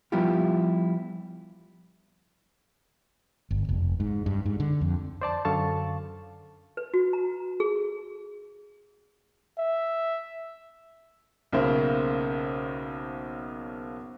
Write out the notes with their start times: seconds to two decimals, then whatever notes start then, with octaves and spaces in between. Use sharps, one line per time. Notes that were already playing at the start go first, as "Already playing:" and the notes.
0.12 F3 G3 B3 E4 F4 G4
3.51 G1
3.69 F1
4.00 G#2
4.26 G2
4.46 G#2
4.60 D3
4.81 F2
5.21 C5 D5 A5
5.45 F#2 D3 A4 F5 A5 C#6
6.77 B4
6.94 F#4
7.13 A#5
7.60 G#4
9.58 E5
11.53 B1 C#3 A#3 C5 E5